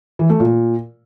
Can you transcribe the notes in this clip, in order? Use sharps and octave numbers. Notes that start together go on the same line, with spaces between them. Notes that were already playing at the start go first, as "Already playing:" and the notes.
E3
A3
A#2